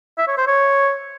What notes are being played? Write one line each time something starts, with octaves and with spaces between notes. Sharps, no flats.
E5
C#5
C5
C#5